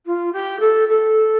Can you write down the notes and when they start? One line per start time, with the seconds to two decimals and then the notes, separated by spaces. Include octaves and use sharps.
0.06 F4
0.33 G4
0.60 A4
0.88 A4